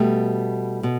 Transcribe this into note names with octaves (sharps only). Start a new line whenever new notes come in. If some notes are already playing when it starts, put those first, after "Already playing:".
Already playing: B2 G3 A3
B2